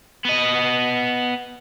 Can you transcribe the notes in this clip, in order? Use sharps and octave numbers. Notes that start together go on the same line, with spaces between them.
B3 D#5